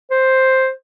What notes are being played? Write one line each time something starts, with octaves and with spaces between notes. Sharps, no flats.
C5